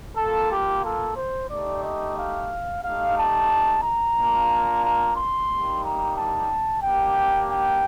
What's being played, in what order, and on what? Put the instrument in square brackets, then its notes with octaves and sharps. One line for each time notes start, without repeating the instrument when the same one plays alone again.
[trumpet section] A#3 F4 A4
G4
A4
C5
A3 D#4 G4 D5
D#5
F5
A3 D#4 G4 F5
A5
A#5
A#3 D4 F4
A#5
C6
G3 A#3 D#4 G4
A#5
A5
A#3 D4 G4 G5
G5